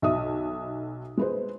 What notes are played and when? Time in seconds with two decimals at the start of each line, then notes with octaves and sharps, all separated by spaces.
0.02 B1 D#5 E5 D#6
1.17 G#3 B4 C5